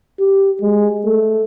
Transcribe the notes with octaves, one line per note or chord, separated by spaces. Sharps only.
G4
G#3
A3